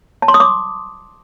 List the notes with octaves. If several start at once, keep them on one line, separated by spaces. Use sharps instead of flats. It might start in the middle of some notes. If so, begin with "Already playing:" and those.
A5
C6
D#6
D6